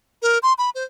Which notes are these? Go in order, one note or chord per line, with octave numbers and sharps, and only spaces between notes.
A#4
C6
B5
C5